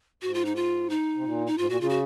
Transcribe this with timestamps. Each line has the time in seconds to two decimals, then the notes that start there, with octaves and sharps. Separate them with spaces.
0.22 G#2 F#4
0.34 F4
0.45 D#4
0.56 F4
0.90 D#4
1.15 C3
1.24 A#2
1.47 D#4
1.58 G#2 F4
1.69 A#2 F#4
1.81 C#3 F4
1.89 F#4